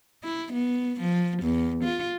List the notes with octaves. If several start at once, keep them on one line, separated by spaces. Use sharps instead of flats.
E4
B3
F3
E2
F4